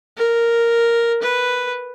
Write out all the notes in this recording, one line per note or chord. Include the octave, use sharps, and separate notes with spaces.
A#4
B4